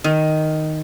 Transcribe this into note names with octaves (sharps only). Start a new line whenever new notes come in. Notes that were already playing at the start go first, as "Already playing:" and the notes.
D#3